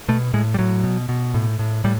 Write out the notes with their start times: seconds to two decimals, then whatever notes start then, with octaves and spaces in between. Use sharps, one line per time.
0.08 B2 A3
0.33 A2 G#3
0.54 G3
0.58 A2 F#3
0.84 B2
1.09 B2
1.34 A2
1.59 A2
1.84 A2 G3